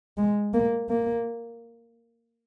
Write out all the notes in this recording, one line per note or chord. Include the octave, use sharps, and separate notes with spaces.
G#3
A#3
A#3